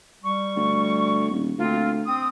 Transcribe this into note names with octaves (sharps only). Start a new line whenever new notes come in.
G3 C#6
D2
D#1
D2 A#3 C4 F4
C4 D#6